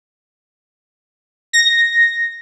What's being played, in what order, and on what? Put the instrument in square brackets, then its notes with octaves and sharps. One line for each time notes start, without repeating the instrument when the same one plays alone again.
[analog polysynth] A#6